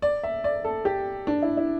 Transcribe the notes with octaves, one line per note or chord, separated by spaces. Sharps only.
D5
E5
D5
A4
G4
D4
E4
E4